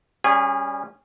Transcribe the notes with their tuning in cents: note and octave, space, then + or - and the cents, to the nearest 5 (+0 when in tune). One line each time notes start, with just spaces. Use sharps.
G3 +0 C#4 +0 G#4 -30